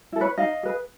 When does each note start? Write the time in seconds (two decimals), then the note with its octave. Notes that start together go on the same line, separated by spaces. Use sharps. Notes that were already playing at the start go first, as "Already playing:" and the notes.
0.12 E4 A4
0.21 B4 C#5
0.38 D#4 D#5 F5
0.63 G#4 B4